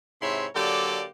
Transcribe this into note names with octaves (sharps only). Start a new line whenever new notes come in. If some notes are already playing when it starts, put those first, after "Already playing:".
G#2 C3 E4 C#5 E5 C6
D3 F#3 A#3 G4 A4 D5